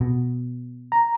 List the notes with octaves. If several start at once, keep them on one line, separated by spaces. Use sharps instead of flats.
B2
A#5